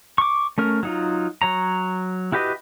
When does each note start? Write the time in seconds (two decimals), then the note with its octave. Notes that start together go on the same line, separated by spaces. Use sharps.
0.18 C#6 D6
0.58 A3 C#4 A#4
0.83 F#3 D#4 F4
1.42 F#3 C#5 A#5
2.32 E4 F#4 G4 B4 D#5